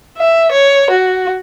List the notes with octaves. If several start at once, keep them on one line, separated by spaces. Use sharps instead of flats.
E5
C#5
F#4